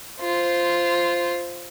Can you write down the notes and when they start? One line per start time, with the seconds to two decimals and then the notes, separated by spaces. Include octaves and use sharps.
0.21 F4 C5